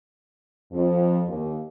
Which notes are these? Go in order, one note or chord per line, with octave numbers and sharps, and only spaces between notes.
F2
D#2